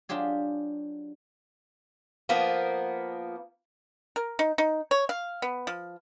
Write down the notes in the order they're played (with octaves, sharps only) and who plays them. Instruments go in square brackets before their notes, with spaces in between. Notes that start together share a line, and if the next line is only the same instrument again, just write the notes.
[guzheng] F#3 D4 F4 G4 G#4
[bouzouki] F3 A#3 B3
[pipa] A#4
D#4
D#4
C#5
F5
B3
F3